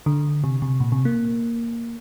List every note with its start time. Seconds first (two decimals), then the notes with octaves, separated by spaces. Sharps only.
0.06 D3
0.44 C3
0.62 C3
0.80 A#2
0.92 C3
1.05 A#3